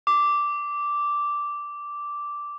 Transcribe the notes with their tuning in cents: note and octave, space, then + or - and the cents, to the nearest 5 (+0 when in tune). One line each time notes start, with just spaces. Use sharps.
D6 -5